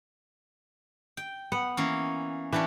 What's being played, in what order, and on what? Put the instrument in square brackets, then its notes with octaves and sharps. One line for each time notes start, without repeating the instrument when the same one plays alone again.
[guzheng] G5
[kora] B3 [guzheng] F#5
[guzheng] E3 A#3 C#4
[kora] E3 [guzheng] C#4 D4 G4